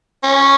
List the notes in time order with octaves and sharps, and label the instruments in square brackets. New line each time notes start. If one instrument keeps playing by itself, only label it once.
[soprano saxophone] C#4